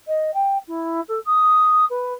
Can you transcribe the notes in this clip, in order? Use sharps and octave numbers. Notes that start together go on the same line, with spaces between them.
D#5
G5
E4
A4
D#6
B4